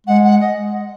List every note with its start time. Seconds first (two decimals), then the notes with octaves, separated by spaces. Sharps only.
0.06 G#3 F#5
0.23 F#5
0.40 D#5